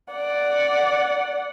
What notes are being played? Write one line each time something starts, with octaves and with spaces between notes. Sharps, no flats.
D5 F#5